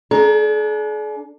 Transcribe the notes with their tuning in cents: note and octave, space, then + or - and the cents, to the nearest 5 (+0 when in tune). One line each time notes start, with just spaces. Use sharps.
D4 -5 G#4 +45 A#5 +0